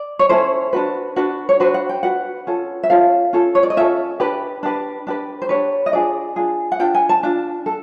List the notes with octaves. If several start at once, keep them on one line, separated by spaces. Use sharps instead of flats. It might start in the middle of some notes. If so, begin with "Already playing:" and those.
Already playing: D5
C#5
C#4 E4 A4 C5
D4 F#4 B4
D4 F#4 B4
C#5
D4 F#4 B4 C5
F#5
G5
D4 F#4 B4 F#5
C#4 F4 A4
E5
C#4 F4 A4 F5
C#4 F4 A4
C#5
D5
D#5
C#4 F4 A4 E5
D4 G4 B4
D4 G4 B4
D4 G4 B4
C5
D4 G4 B4 C#5
D#5
D4 F4 G#4 D5
D4 F4 G#4
F#5
D4 F4 G5
G#5
A5
D4 F4
A4